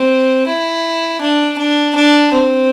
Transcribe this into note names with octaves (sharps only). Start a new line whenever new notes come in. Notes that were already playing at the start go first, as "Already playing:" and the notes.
Already playing: C4
E4
D4
D4
D4
C4